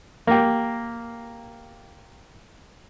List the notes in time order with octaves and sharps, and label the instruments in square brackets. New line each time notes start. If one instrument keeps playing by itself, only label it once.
[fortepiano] A#3 G4